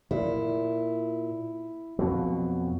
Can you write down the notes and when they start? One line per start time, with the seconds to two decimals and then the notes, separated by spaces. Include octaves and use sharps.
0.11 A#2 E4
1.99 F2 B2 F#3